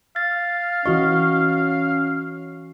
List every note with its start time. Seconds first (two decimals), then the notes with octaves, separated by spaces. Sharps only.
0.16 F5 A6
0.86 E3 C#4 F#4 D#5 C#6